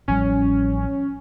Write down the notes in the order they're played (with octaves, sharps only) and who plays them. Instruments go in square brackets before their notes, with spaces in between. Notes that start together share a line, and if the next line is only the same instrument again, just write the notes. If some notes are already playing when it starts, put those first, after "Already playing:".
[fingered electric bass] A1 F3 G3 [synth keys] C#4